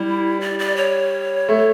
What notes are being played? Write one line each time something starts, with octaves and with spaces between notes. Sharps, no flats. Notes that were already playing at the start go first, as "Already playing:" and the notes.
Already playing: G3 E4
D5
D5
C#5
A3